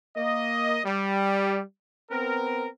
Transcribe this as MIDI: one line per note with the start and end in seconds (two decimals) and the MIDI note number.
0.17 0.80 58
0.17 0.80 75
0.85 1.60 55
2.11 2.67 59
2.11 2.67 60
2.11 2.67 70